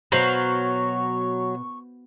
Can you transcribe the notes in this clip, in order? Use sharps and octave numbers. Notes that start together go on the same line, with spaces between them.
B2 F#3 F#4 C5 F5 C#6